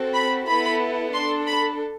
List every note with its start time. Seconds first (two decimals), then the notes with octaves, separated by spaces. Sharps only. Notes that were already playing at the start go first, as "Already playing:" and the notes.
Already playing: C4 F#4 A4
0.14 B5
0.47 B3 E4 A4 B5
1.14 D4 A4 C6
1.47 B5